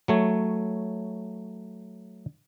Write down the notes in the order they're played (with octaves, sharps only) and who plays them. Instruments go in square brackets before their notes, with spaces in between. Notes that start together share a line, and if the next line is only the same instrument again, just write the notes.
[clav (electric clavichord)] F#3 A3 C#5